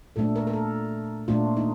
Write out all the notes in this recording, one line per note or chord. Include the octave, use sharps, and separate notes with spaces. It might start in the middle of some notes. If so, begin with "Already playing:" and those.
A#2 A3 D4 A4
A#4
A#4
A4
A#2 A3 D4 F4
D#4